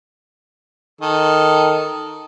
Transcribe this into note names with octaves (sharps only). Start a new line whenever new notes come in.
D#3 A4